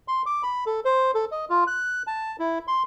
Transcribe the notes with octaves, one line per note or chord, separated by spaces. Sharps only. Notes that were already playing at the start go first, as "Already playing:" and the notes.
C6
D6
B5
A4
C5
A4
D#5
F4
F#6
A5
E4
C6